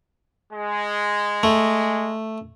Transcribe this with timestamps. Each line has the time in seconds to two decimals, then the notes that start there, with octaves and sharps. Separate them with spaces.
0.52 G#3
1.43 A3